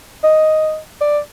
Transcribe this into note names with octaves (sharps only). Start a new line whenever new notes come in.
D#5
D5